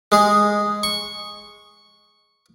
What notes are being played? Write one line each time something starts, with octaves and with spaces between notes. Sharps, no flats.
G#3 G#4
C#6